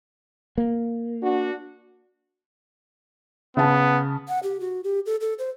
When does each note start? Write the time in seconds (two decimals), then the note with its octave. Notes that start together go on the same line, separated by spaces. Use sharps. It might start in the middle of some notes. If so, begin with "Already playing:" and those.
0.58 A#3
1.22 D4 F#4
3.57 C#3 B3 A5
4.28 F#5
4.43 G4
4.60 F#4
4.84 G4
5.06 A4
5.21 A4
5.39 C5